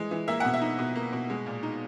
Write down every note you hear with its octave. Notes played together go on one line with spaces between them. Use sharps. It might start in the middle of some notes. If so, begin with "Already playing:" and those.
Already playing: E3 G#3 D#5
E3
A#3 E5
B2 F#5
E5
D#4
B2
A#3
B2
G#3
A#2
D#4